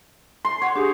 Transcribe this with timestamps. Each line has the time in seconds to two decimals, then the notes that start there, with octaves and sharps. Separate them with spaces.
0.45 C6
0.62 C#5 F#5
0.76 D4 G4 G#4